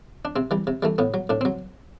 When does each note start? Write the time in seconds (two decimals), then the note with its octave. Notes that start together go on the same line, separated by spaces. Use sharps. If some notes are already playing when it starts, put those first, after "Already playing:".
0.25 D4
0.36 C3 C4
0.51 E3 G3
0.67 C3
0.83 E3 G3 A3
0.98 A2 B3
1.14 F#3
1.29 A2 D4
1.41 F#3 C4